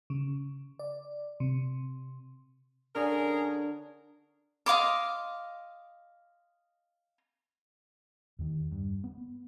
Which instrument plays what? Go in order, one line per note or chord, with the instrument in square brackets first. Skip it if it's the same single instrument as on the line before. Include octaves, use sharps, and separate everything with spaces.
[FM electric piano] C#3
D5
C3
[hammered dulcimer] D3 [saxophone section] C#4 G#4 A#4
[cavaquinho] D#5 F5 C6 D6
[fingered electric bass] E2 D#3
G2
B3